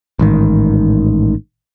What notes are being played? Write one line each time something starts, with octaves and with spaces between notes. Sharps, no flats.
A1 G#2 D#3